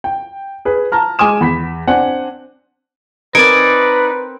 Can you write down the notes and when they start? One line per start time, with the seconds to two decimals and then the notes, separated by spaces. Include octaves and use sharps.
0.04 G5
0.65 G#4 B4
0.92 A5 A#5 F6
1.19 G#3 G#5 D6 D#6 E7
1.41 E2 B5 B6
1.88 C4 D4 F#5 G#5
3.35 C4 D#4 A#4 B4 D5 G#5 D7